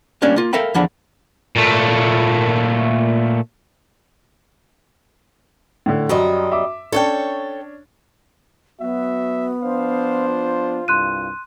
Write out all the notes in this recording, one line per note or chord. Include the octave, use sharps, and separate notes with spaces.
G3 A#3 C#4 D4
A#3 F4
A4 A#4 E5 F5 G5 B5
E2 D3 F3 D4 F#5 B5
A#2 A3
A2 D3
F#2 F#3 G3 D#5
E5 D6
C#4 D4 A4 C#5 G5
F#3 B3 F#4 E5
F3 D4 C5 F5
F4
C2 G2 C6 F#6 D#7